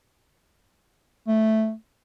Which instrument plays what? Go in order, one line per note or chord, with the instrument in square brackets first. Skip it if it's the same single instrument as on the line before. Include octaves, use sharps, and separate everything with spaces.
[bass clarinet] A3